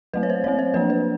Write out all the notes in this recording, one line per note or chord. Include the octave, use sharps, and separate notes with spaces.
F#3 A3 C4 B4
C#5
C5
F#3 A3 C4 C#5
C5
F3 A#3 D4 B4
B4